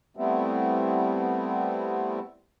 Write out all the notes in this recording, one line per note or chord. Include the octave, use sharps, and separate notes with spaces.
G3 A3 B3 C4 E4